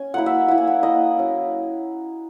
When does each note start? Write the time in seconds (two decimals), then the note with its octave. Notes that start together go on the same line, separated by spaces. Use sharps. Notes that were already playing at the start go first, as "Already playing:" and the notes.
Already playing: C#4 G#5
0.14 F#3 A#3 E4 F#5
0.26 E5
0.48 A#3 E4 F#5
0.58 G#5
0.67 F#5
0.83 A#3 E4 D#5
1.17 F#3 C#4 E4